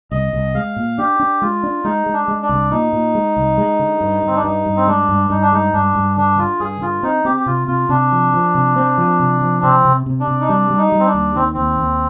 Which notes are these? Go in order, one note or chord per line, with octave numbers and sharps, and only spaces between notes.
C2 D#5
C2
G#3 F5
A#2
D4 G4
D4
G#3 F4
D4
G#3 D#4
G#3
D4
G#3
D4
C2
A#2 D#4
A#2
G#3
C2
G#3
D3
G2
G2 C4
D4
G2 D#4
G2
C4
G#3 D4
G2
G2 D#4
D4
G#3 D#4
G2 D4
G2
D3 D4
D3 F4
G2 G#4
D3 F4
C4 D#4
C4 G4
G4
C3 F4
C3 F4
C3 D4
F3
F3
C3
C4
F3
C3
F3
C3 C4
C3
C3
D4
C3
D#4
G3 D4
G3
D#4
G3
C4
D4
D#2
D#3 C4
D#2 C4
D#2